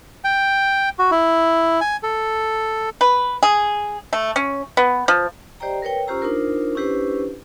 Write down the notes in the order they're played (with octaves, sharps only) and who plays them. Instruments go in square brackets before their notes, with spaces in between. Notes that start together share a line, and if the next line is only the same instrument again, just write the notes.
[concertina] G5
F#4
E4
G#5
A4
[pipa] B4
G#4
A3
C#4
B3
F3
[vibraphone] G4 C5 D5 D#5 G5 A#5
A#4 B4 C#5 G5
C#4 F4 G4 C5 A#5 E6
D4 D#4 F4 A#4 C5
C#4 D4 E4 G4 B4 C5